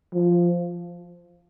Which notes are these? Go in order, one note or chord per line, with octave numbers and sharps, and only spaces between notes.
F3